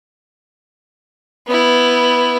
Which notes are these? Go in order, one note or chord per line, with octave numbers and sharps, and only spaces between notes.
B3 E4